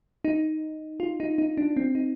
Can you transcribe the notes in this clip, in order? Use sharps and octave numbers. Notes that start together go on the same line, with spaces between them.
D#4
F4
D#4
D#4
D4
C4
D#4